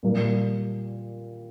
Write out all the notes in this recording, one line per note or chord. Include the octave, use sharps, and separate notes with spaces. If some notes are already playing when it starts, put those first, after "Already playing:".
A#2 G3 A#3